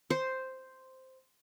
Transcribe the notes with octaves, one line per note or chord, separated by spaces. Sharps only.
C5